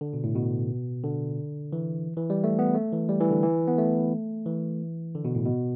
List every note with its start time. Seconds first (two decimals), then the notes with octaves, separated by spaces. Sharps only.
0.01 D3
0.13 B2
0.24 A2
0.35 B2
1.04 D3
1.73 E3
2.17 E3
2.30 G3
2.44 A3
2.59 B3
2.75 A3
2.93 E3
3.09 G3
3.21 E3
3.31 D3
3.43 E3
3.68 B3
3.78 A3
4.46 E3
5.15 D3
5.25 B2
5.35 A2
5.45 B2